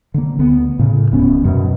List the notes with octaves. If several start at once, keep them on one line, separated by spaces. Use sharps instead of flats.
D3 A#3
D2 D3 B3
A2 C#3
D#1 D2 B3 C#4
F#2 B2 F#3